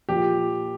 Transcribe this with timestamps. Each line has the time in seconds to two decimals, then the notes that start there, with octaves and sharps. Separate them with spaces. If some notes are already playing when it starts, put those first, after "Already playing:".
0.09 A#2 F3 G4